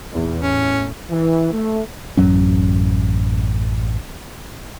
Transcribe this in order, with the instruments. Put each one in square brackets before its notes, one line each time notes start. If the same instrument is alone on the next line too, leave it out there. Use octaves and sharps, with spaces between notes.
[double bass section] E2 A#2
[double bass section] A2 [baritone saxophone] C#4
[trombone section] E3
A3
[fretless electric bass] A1 F#2 F#3 C#4